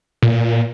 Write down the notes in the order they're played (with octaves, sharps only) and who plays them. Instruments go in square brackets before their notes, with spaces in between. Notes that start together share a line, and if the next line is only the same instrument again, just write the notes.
[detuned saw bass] A#2